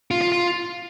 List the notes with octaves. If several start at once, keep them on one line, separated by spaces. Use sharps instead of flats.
F4
F4
F4